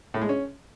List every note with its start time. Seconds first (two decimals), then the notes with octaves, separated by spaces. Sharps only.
0.14 A2
0.22 G#3
0.29 C#4